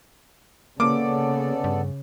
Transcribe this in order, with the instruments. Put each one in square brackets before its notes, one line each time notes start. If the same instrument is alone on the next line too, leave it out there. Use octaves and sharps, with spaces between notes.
[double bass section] C#3 [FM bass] A#3 [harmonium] B3 A4 D5 [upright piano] D6
[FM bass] G2